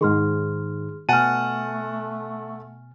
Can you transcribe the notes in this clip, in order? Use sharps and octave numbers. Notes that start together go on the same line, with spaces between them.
G#2 D#3 G#4 C6 F6
B2 A3 F#5 G#5 A5 F6 D#7